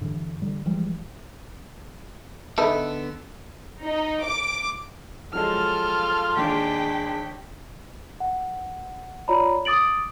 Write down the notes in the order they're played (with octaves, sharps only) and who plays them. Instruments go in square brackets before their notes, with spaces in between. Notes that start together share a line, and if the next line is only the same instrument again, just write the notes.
[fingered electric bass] G2 D3 E3
D3 G3
E3 F3 G3 G#3
[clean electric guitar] D3 B3 A4 [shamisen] D#4 B4 E5
[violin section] D#4
D6
[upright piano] F3 F#3 G#3 [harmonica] F4 A4 [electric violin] F6
[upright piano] D#2 [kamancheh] G#3 D4 [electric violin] G5 B6
[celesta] F#5
F4 C#5 D5 A#5 B5
D6 D#6 A6 D7 F#7